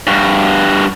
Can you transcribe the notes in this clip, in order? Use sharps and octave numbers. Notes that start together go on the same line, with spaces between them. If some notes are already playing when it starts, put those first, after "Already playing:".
G2 F#4